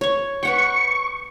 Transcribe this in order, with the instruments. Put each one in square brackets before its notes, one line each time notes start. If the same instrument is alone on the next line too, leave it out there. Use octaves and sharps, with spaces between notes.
[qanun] C#5 C#6
[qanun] B4 F#5 G5 [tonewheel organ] C#6